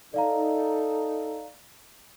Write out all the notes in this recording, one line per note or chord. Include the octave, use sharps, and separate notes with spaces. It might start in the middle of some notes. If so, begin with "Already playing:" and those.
D#4 A4 D5 F5 A#5